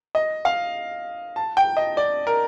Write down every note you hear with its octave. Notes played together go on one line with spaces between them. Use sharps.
D#5
F5
A5
G5
D#5
D5
A#4